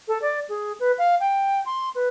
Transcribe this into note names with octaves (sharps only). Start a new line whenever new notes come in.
A4
D5
G#4
B4
F5
G5
C6
B4